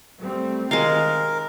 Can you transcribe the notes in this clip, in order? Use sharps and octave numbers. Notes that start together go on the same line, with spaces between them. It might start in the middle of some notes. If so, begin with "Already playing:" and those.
G3 A3 C4
C3 D#3 G#3 A#4 F5